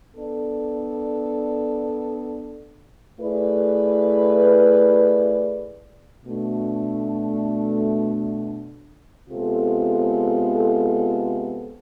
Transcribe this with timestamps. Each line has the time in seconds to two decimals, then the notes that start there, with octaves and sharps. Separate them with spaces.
0.14 B3 D4 A4 D5
3.19 A3 E4 G#4 B4 D5
6.24 B2 A3 D4
9.29 C3 G#3 B3 F4 A4